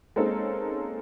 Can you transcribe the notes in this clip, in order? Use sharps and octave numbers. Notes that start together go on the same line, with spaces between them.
G#3 A#3 C4 C#4 D#4 A4